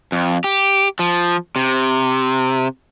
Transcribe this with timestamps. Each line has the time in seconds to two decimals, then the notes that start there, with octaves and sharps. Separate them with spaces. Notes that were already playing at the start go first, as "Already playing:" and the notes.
0.12 F2
0.44 G4
0.99 F3
1.56 C3